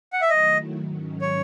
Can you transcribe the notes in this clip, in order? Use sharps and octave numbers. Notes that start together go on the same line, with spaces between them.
F#5
E5
D#3 F#3 A3 E4 D#5
G#2 D#3 F#3 C#4
C#5